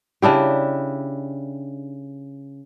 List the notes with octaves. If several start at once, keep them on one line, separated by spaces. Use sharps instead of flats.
C#3 D4 E4 G4